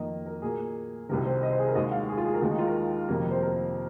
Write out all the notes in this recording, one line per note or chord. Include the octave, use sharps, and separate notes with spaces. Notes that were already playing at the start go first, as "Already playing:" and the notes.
Already playing: F2 D#3 A#3 D#5
A#4
A#2 A#3 G#4
C2 C3 D#3 A#4
C5
D#5
C5
G#4
A#4
D#2 D#3 G#3 D#5
F5
G#4
F4
G#4
A#4
D#2 D#3 G#3
D#4
F4
A#4
F2 C3 D#3 A#3
C5
A#4